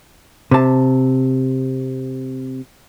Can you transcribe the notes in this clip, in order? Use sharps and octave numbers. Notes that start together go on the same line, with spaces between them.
C3 A5